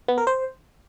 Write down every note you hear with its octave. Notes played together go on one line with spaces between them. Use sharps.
B3
A#4
C5